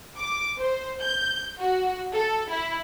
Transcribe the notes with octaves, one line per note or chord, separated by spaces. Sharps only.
D6
C5
G6
F#4
A4
E4